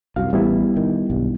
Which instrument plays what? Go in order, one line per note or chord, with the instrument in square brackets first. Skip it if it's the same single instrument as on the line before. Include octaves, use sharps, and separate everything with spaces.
[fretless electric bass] C2 F#2 [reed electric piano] F#4 F5
[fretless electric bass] A1 [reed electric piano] G3 B3 E4
[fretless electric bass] D#3
B1 G2